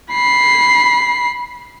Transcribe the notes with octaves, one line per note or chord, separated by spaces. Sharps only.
B5 C7